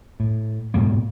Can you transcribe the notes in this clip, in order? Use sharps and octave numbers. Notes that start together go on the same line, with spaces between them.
A2
G#2 B2 G#3 A#3